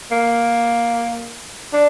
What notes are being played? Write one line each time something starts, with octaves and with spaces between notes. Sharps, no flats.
A#3
D4